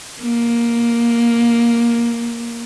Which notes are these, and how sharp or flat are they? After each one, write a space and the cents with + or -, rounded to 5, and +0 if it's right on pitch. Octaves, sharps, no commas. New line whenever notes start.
A#3 +10